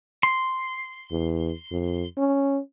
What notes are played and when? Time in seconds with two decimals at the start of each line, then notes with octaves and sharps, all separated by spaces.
0.23 C6
1.12 E2
1.72 F2
2.18 C#4